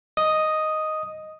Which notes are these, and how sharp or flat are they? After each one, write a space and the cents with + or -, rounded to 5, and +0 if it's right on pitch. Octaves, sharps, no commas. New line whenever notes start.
D#5 +0 D#6 +0